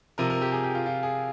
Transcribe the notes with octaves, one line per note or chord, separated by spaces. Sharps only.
C3 F3 A#4
A#4
G4
G#4
G4
F4
F4
G#4